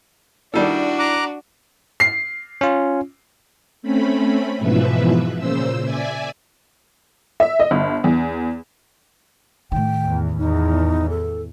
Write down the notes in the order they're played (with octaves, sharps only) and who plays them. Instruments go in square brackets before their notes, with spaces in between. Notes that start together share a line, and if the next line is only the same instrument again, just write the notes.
[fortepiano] D#3 G3 A4 [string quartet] D4 F#4 [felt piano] E4
[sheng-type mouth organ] A#5 D6 F#6
[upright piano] C7
[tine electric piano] C#4 F4
[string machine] A3 C4 C#4 B5
G#2 B2 E3 F3 B4 E5
A#2 C#3 C5 E6
D5 E5 G#5
[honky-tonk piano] E5
D#5
G1
E2
[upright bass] A2 D#3 [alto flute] G5
[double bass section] E2
[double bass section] E2 [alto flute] D#4
[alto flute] A4